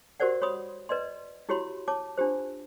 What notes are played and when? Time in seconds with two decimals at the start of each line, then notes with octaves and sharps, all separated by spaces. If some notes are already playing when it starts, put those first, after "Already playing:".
0.20 F#4 G4 A#4 C5 D5 F#5
0.42 C#5 B5 C6 D#6
0.89 B4 D5 D#5 C6
1.49 E4 F#4 G4 C#5 B5 C6
1.88 C#5 A5 D6
2.18 D4 F4 G4 C5